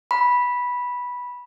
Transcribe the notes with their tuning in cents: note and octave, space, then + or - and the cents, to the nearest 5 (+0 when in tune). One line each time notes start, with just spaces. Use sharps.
B5 -10